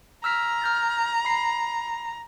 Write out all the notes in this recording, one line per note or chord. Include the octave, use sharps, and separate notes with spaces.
A#5 E6 F6 B6
F6 G6 A6
B5 C7